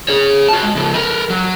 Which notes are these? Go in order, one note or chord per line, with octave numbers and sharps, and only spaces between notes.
G#4 C#5
F#4 A5
G#3
C#3 F3
A#4 B4
F#3